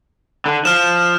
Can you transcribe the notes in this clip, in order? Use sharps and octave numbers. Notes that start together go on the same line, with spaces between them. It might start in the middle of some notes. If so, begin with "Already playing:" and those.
D3
F3 F6 E7